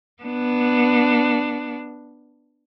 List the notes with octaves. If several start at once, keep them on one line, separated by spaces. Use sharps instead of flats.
B3 D4